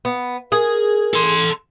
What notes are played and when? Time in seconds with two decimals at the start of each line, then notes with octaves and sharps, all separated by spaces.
0.05 B3
0.52 G#4 A#4
1.14 A4 C6